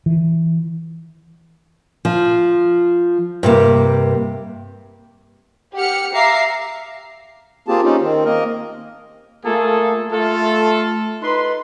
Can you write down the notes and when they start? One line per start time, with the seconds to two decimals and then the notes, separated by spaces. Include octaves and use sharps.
0.06 E3
2.05 F3
3.43 G2 C3 A#3
5.75 G4 F#5 F6 C#7
6.14 E5 F5 A#5 D6 C7
7.67 A#3 C4 F4 G4 G#4 A5
7.84 C4 C#4 D#4 F4 G4
8.01 D#3 C4
8.25 A#3 A#4 D#5
9.45 A3 A#3 F4 G#4 A4
10.12 A3 F4 A4
11.23 D#4 B4 C6